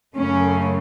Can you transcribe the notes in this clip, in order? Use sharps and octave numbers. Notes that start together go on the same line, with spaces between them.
F#2 C#3 A3 C#4